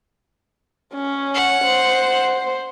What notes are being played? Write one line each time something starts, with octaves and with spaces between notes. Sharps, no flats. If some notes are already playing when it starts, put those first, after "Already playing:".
C#4
F#5
C5